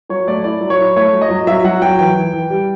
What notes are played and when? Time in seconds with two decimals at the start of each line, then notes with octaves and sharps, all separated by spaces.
0.09 F#3 C#5
0.27 A3 D5
0.44 E4 D5
0.61 F#3
0.70 C#5
0.79 E4
0.96 A3 C#5
1.13 F#3
1.21 D#5
1.30 F#3
1.47 F#3 E5
1.64 F#3 F#5
1.82 F#3 G5
1.99 E3 G5
2.16 E3
2.33 E3
2.50 G3